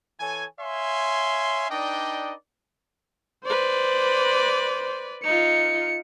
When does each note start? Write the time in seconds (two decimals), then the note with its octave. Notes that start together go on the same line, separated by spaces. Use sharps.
0.20 E3 A4 C#5 G#5
0.60 C#5 E5 F5 G#5 C6
1.70 D4 D#4 B4 D5 D#5 G5
3.46 B4 C5 D5
5.24 D#4 F4 C#7